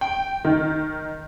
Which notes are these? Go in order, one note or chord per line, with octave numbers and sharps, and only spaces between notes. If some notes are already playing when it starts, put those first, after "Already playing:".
G5
D#3